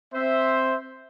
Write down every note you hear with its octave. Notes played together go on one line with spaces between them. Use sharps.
C4 C5 E5